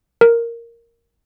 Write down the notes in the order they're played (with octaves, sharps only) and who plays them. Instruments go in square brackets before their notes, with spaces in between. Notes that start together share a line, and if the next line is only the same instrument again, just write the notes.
[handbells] A#4